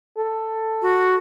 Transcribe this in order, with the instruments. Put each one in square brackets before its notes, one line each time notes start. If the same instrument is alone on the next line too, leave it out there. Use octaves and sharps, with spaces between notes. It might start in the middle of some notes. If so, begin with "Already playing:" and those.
[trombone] A4
[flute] F#4